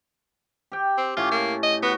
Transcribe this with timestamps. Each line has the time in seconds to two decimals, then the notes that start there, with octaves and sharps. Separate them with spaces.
0.72 G4 G5
0.97 C4
1.17 A2 C#4 F4 D6
1.31 A#3
1.63 D#5
1.83 B3 F#4